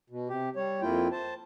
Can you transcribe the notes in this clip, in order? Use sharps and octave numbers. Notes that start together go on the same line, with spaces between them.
B2
C3 G4
G3 C#5
F2 A#3 E4 F4 G5
C5 A5